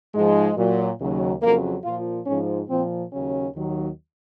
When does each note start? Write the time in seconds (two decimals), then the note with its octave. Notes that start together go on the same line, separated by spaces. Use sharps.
0.14 G#2 F3 G#3
0.57 A#2 F#3
0.99 D#2 C#3 F#3
1.42 F2 C#3 F#3 A#3
1.84 A#2 F3 F4
2.26 G#2 F3 C#4
2.69 A#2 F3 C4
3.11 D#2 C#3 F#3 C#4
3.55 D#2 D#3 F#3